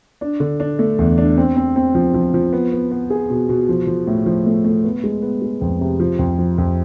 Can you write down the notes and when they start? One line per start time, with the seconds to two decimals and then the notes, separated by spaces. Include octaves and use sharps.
0.21 D4
0.40 D3
0.60 D4
0.79 A3
0.99 E2
1.18 D4
1.37 C4
1.57 C4
1.76 C4
1.95 F3
2.14 F3
2.34 F3
2.53 B3
2.72 B3
2.91 B3
3.10 G#4
3.30 B2
3.49 B2
3.69 F3
3.87 F3
4.07 A2
4.26 F3
4.46 A3
4.64 A3
4.84 B3
5.04 G#3
5.22 B3
5.42 G#3
5.61 F2
5.81 C3
6.00 F3
6.19 F2
6.39 F3
6.58 F2